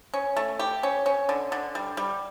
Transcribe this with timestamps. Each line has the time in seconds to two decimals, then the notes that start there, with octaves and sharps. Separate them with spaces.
0.14 C#4
0.36 A3
0.59 G4
0.83 C#4
1.06 C#4
1.29 D3
1.52 D3
1.75 G3
1.97 G3